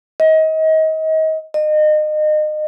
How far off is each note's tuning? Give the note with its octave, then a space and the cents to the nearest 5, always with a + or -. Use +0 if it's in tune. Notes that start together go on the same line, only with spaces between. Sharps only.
D#5 +30
D#5 -30